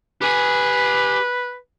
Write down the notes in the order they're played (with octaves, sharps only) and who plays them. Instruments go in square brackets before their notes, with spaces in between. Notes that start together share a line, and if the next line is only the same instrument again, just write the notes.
[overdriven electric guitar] G4 G#5 [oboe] B4